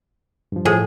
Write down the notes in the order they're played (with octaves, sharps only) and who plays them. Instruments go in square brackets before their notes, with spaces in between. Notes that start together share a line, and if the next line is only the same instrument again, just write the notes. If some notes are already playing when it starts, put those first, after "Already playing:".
[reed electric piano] G2 F3
[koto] A2 G#4 [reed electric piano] F3 A4